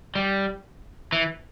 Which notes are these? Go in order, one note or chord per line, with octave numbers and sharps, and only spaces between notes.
G3
E3